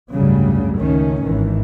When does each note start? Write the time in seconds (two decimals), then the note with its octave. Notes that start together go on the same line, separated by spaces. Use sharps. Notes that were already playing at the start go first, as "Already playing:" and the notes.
0.13 F#1 D2 G#2 C#3 F#3 G3
0.79 C#2 D#3 A3 C#4
1.22 G#1 D#3 E3